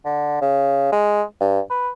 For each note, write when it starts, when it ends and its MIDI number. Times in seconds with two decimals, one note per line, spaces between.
0.05 0.40 50
0.41 0.88 49
0.92 1.22 56
1.40 1.60 43
1.70 1.90 71